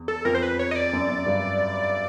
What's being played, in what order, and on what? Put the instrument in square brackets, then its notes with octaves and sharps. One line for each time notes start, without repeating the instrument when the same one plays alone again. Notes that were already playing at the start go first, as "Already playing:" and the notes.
Already playing: [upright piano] E2
[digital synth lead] A4
[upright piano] F2 [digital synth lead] A#4
[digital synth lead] C5
B4
C#5
D#5
D5
[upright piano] F#2
F#2
G2